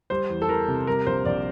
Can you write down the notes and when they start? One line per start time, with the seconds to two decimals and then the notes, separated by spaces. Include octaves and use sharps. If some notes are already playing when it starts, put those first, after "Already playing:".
0.10 G3 C5
0.29 E2
0.42 A4
0.49 E2 A#4
0.68 C3
0.87 G3 A#4
1.07 A#1 C5
1.25 A#1 D5